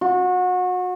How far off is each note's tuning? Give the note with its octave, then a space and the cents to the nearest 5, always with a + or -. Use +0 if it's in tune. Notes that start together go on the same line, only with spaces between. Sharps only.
F#4 -30